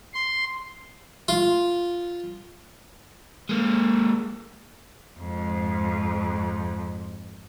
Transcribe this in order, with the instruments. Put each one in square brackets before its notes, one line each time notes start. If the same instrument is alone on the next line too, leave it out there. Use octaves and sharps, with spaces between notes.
[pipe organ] C6
[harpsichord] F4
[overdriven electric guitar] G#3 A#3
[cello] F2 G#2